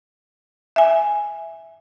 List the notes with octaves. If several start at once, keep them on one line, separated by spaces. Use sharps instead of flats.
E5 G#5